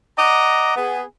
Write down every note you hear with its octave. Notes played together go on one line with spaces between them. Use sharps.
D5 D#5 F#5 A#5
B3 G#4